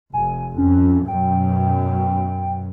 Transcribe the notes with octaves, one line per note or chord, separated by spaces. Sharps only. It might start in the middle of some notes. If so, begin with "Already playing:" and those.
F1 G#5
F2 C#4
F#2 B2 G5